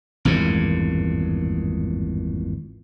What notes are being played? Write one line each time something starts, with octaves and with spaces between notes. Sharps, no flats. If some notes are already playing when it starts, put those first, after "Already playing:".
G#1 E2 G2 A#2